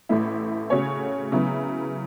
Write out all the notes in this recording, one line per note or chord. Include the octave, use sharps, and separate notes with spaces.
A1 A2 A3 E4
C#3 A3 F#4 C#5
C#3 F#3 B3 E4